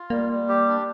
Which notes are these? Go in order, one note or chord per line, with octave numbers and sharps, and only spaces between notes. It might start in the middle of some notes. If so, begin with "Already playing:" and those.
Already playing: F4
G3 A#3
G3
G4
D4